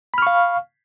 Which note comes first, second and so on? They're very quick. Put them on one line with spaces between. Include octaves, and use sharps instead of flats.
B5 F6 C#6 F5